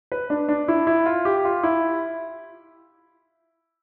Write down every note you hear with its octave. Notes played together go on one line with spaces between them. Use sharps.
B4
D4
D4
E4
E4
F4
G4
F4
E4